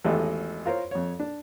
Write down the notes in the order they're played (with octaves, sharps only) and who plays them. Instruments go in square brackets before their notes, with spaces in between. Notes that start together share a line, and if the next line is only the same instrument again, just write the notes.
[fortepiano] G#1 E2 A3 G4 D#5
F4 A#4 C5 C#5
F2 C#5
D4